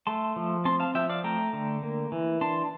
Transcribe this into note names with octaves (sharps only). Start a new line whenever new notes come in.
A3 A5 C6
F3
C4 A5 C6
F5 A5
F3 E5 G5
D5 F5
A3 G5 A#5
D3
A#3
E3
D4 A5 C6